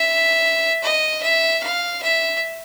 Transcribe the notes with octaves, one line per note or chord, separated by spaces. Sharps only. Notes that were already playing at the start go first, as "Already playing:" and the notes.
Already playing: E5
D#5
E5
F5
E5